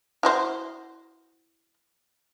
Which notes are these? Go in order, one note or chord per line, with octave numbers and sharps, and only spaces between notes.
E4 F#4 C5